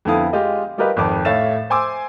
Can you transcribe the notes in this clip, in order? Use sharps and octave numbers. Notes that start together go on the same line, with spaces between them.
F2 D3 B3 E4 F5 D#6
G#3 F4 G4 D#5
G3 F4 G4 A#4 B4 D#5
G#1 F2 D6
A2 C#5 E5 F5 A6 E7
C5 G#5 C6 D6 E6